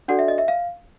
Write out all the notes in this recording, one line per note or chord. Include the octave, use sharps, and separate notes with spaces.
D4 F#4 A4 D5 F#5
E5
D#5
E5
F5